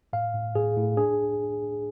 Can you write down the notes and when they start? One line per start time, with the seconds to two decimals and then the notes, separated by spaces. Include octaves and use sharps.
0.13 A2 F5
0.34 A2
0.55 A2 G#4
0.76 A2
0.97 D4 G#4